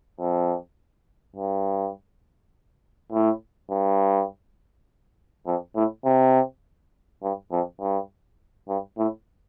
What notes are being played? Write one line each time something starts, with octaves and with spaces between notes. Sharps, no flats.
F2
G2
A2
G2
F2
A2
C3
G2
F2
G2
G2
A2